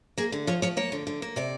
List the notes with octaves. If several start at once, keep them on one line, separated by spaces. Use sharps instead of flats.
A#3 G#4
D3
F3 C#5
F3 C#5
A#3 C#5
D3
D3
A#3
C3 D5